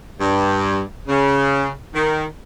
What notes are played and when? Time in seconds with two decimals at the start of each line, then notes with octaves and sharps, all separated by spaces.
0.20 G2
1.08 C#3
1.94 D#3